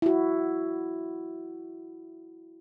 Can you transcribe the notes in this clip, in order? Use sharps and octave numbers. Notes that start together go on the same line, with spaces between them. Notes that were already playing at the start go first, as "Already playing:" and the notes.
E4 F#4